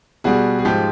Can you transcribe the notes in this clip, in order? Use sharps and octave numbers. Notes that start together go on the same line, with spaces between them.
B2 G3 F#4 G#4
G#4
G#2 F3 G#3 G4